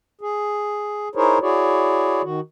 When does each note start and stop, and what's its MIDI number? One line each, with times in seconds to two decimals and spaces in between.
0.21 1.09 68
1.15 1.38 63
1.15 1.38 64
1.15 1.38 68
1.15 1.38 70
1.15 1.38 72
1.15 1.38 73
1.41 2.22 64
1.41 2.22 66
1.41 2.22 68
1.41 2.22 73
1.41 2.22 74
2.23 2.40 51
2.23 2.40 66